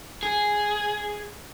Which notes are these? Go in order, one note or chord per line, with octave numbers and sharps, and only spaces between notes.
G#4